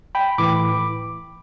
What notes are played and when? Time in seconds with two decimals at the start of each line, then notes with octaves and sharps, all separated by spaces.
0.15 G5 B5
0.38 A2 E3 B5 D6